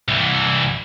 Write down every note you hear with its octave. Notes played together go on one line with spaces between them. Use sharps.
C2 E3